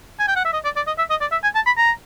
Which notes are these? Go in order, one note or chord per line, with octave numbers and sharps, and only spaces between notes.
G#5
G5
F#5
E5
D#5
D5
D5
D#5
E5
D#5
D5
E5
G#5
A5
B5
A#5